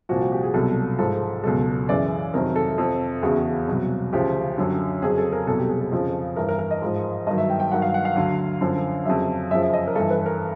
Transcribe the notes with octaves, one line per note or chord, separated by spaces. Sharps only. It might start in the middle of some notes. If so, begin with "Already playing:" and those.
C2 A#2 F3 F#4
F#4
G4
G#4
C2 B2 F#3 A4
G#2 F3 A4
C#2 B2 F#3 A4
F#2 C#3 E3 D5
F2 C3 D#3 F#3 A#4
A4
F2 C3 F3
E2 C#3 E3 F#4
C2 B2 F#3
D2 C#3 F3 G4
F#2 D3 F#3
F2 C#3 F#3 G#4
A4
A#4
C2 B2 F#3 A4
G4
G#4
A4
F2 C#3 F3
G2 E3 A#4
A#4
A#4
D#5
G#2 F3
G2 D#3 F#3 D#5
E5
G5
G5
G2 D#3 F#3 F#5
F5
F#5
F5
D2 D3 F#3
F#2 D3 F3
F2 C#3 F#3 E5
F#2 C#3 F3 E5
E5
D#5
A#4
G2 E3 A4
B4
A#4